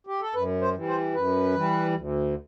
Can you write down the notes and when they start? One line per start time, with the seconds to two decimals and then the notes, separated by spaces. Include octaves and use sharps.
0.07 G4
0.21 A4
0.35 F#2 B4
0.62 C5
0.75 E3 G3
0.88 C5
1.15 F#2 B4
1.54 E3 G3
1.95 D2